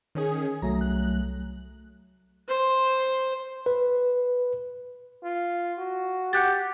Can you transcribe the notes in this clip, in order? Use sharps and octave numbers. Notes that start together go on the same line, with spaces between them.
D#3 C#4 G#4
C2 F#3 A3 A#5
F#6
C5
B4
F4
F#4
G4 F#5 F#6 A6